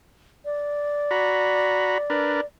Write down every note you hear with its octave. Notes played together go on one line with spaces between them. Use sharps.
D5
F#4 A#5 B5
D4 A#4 B4